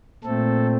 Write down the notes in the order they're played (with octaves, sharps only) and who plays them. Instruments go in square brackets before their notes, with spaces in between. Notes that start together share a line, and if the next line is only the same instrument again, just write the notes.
[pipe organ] A#2 A3 C4 A4